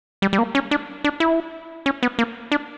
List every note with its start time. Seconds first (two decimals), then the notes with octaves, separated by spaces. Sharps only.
0.22 G3
0.33 G3
0.38 A#3
0.55 C#4
0.71 D4
1.04 D4
1.20 E4
1.86 C#4
2.03 B3
2.19 A#3
2.52 D4